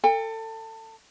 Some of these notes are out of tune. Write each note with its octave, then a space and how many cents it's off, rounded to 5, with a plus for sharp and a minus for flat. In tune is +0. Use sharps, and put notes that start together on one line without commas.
A4 +25 G5 +40